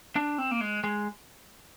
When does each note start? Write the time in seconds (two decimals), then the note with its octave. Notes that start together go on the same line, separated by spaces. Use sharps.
0.16 D4
0.38 C4
0.51 A#3
0.61 G#3
0.84 G#3